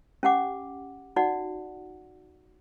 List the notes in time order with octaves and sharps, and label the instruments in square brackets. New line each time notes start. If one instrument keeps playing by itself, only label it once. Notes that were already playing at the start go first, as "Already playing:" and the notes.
[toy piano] C#4 G4 F#5 D6
D#4 F#4 D5 F#5